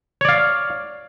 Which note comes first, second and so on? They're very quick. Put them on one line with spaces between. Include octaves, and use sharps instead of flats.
C#5 D5 F5